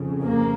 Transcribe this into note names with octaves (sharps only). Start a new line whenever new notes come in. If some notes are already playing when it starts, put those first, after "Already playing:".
Already playing: F2 C#3
A#3